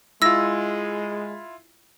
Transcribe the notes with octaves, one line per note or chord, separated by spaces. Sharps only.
G#3 E4 F4 E6 A#6